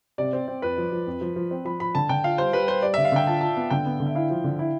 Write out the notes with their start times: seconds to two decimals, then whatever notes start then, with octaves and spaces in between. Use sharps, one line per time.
0.18 C3 D5
0.33 C4
0.48 C4
0.62 F2 B4
0.78 F3
0.92 F3
1.07 F2
1.21 F3
1.36 F3
1.51 C4
1.65 F3 B5
1.80 F3 B5
1.95 D3 A5
2.09 D3 G5
2.24 F4 F5
2.38 G3 C5
2.53 G3 B4
2.68 G3 C5
2.82 G3 D5
2.94 D3 E5
3.05 F5
3.12 D3 G5
3.27 F4 A5
3.41 F4 A5
3.57 B3
3.70 D3 G5
3.86 B3
4.00 D3
4.06 E5
4.15 E4 F5
4.30 F3
4.44 D3
4.59 E4